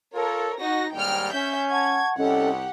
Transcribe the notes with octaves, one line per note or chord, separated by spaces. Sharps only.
F4 A4 A#4 C#5
D#4 F#4 A#6
D#2 G#2 G3 G5 F6
C#4 E5 G6
F#5 A5 C#6 G#6
C2 C#4 G4 A4 D#5 F#5